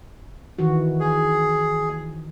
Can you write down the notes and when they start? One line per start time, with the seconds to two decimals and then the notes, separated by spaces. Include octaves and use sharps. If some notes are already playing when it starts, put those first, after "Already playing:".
0.59 D#3 E3 F#4
1.00 G#4